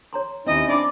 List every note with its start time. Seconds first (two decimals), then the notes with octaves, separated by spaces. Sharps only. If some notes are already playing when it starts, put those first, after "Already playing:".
0.13 C#5 A#5 C6
0.47 D#2 C4 C#4 D#4 E4 D#5
0.69 C4 D4 D5 D#5 B5 D6